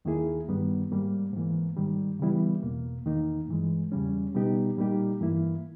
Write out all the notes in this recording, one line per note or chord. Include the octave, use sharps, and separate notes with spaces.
D#2 D#3 A#3 E4 G#4
G2 D#3 G3 B3
G#2 G3 A#3
G#2 E3 A#3
G#2 D#3 G3
C#3 E3 G3 B3 E4
E2 B2 A#3
E2 D#3 A#3 D#4
G2 E3 G#3
E2 C#3 G3 C#4
B2 G3 B3 D#4 G4
A#2 G3 A#3 D#4 G4
G2 E3 A#3 E4